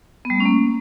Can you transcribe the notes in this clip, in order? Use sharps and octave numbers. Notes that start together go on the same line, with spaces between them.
B3
G3
A3
C#4
A#3